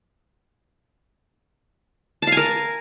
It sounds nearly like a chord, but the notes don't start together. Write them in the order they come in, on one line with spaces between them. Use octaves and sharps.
A5 F5 G#5 A#4